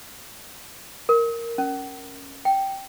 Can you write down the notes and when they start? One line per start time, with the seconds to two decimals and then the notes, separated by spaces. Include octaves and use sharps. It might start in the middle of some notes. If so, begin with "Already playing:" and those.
1.09 A#4
1.58 C#4
2.45 G5